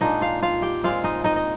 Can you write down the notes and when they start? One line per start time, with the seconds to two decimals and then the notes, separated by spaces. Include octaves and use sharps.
0.01 A#2 G#3 D4 D#4 D#5
0.21 F4 F5
0.42 F4 F5
0.62 G4 G5
0.84 A#2 G#3 C4 F4 F5
1.04 D#4 D#5
1.24 D#4 D#5
1.36 D#5